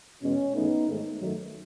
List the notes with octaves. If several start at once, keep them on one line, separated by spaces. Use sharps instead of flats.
E2 B2 G#3 C#4
G#2 E3 A3 B3 D#4
G#2 D#3 A3
F#2 D#3 F#3 A3